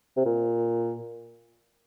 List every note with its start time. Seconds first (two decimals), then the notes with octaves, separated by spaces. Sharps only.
0.17 C3
0.26 A#2